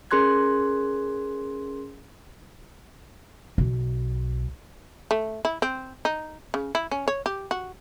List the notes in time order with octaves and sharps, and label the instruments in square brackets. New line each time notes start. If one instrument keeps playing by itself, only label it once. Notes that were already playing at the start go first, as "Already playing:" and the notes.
[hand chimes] C#4 G#4 A#4 C6 F#6 G#6
[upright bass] B1
[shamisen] A3
E4
C4
D#4
C#3
E4
C#4
C#5
G4
F#4